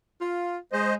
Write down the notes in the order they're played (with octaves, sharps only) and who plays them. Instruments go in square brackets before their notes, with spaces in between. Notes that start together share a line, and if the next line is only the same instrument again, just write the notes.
[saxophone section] F4
[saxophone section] G#3 [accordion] C5 D#5